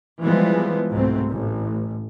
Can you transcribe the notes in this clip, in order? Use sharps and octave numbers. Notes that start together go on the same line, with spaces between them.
E3 F3 G3 G#3 B3
C2 G#2 B2 A3 C4
A1